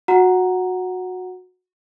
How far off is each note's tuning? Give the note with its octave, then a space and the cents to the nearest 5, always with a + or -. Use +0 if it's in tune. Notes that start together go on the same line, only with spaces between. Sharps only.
F#4 -20 F#5 +0 A#5 +0